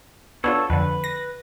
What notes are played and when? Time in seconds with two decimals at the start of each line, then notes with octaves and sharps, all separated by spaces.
0.44 B3 D4 F4 A4 C#5
0.70 F2 D3 B4
1.04 A#6